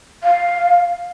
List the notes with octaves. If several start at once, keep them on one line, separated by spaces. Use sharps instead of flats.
F5